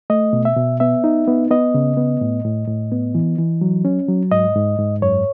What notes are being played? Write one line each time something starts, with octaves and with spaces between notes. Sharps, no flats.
A3 D#5
B2
E5
B2
B3 E5
D#4
B3
B3 D#5
C#3
B3
A2
A2
A2
B3
E3
E3
F#3
C#4
F#3
G#2 D#5
G#2
G#2
F#2 C#5